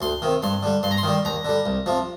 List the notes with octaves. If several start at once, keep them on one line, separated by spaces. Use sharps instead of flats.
D2 C6
C3 D#3
G2 C6
D3 G3
G2 C6
A#5
C6
D#3 G3
D#2 A#5
D3 G3
C2
C3 F3